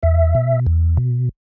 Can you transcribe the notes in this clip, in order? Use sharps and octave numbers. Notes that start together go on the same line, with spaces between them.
E2 E5
B2
E2
B2